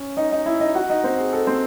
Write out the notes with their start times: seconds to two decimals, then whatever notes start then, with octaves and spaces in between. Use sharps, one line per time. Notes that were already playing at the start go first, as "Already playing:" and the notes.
Already playing: C#4 C#5
0.17 D#4 D#5
0.32 D#4 D#5
0.46 E4 E5
0.60 D#4 D#5
0.75 F#4 F#5
0.90 D#4 D#5
1.04 C4 C5
1.18 G#4
1.33 A4
1.47 C4 C5